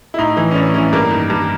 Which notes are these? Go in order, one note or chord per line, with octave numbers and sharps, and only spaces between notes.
E4
A2 D#4
E3
C#4
A2 D4
E3 C#4
G2 A#3
D#3
G2